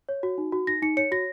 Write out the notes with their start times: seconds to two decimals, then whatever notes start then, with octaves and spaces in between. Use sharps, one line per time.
0.09 C#5
0.23 F#4
0.38 D#4
0.52 F#4
0.67 D#4 A#6
0.82 D#4 C#7
0.97 C#5 C#7
1.12 F#4 A#6